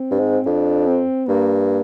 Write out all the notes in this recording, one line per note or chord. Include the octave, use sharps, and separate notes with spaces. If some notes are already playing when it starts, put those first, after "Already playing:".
Already playing: C4
G2
G#2
F2 D4
C4
G2 A#3